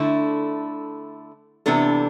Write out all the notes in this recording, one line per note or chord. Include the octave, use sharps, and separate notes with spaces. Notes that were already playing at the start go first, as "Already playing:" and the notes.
Already playing: D3 A3 E4
C3 E3 B3 D4 A4